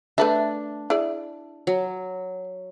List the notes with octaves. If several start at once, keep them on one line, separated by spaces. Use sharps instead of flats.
A3 D4 B4 E5
E4 G#4 D5
F#3